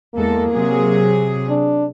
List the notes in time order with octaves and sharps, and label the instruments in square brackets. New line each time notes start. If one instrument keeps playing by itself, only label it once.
[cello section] E2 G#3 A4 [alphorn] A#3
[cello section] C3 F#3 G#4
[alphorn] D4